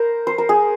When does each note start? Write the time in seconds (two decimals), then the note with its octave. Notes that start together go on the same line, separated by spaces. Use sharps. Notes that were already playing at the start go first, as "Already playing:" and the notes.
Already playing: A#4 C5
0.27 C5
0.38 A#4
0.49 G#4